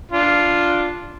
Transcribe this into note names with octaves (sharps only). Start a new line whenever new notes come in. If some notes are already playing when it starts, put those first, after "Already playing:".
D4 F4